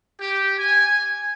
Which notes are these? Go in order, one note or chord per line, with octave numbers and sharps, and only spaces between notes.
G4
G#5